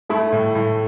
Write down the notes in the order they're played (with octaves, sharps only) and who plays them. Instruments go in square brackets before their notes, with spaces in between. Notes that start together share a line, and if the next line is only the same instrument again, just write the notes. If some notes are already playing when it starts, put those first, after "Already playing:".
[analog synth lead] A3 [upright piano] E4
[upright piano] A2
A2